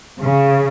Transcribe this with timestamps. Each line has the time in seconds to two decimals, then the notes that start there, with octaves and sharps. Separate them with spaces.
0.21 C#3